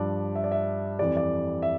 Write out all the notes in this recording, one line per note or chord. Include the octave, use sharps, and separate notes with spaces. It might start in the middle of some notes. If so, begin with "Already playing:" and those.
Already playing: G2 F3 D5
E5
D5
E5
F2 E3 G3 D5
D5
E5